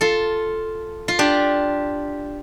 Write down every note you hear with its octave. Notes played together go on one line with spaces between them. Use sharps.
F4 A4
F4
D4 G4